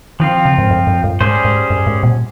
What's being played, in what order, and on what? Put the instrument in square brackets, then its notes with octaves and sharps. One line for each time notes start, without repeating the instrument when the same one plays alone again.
[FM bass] D#3 [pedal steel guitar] F3 C4 F4
[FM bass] C#3
G#2
G2
G2
G2
[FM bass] G#2 [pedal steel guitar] G3 C#4 G#4 C5
[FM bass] G#2
G2
G#2
A#2